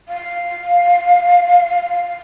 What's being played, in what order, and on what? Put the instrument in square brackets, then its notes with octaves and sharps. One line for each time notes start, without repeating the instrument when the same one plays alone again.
[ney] F5